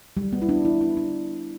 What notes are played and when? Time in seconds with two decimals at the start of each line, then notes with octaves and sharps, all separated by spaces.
0.17 G3
0.33 B3
0.42 E4
0.49 D4
0.65 E4
0.81 E4
0.97 D4